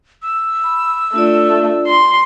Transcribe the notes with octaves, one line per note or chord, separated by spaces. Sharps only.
E6
B5
A3 D4 F4 D5
C6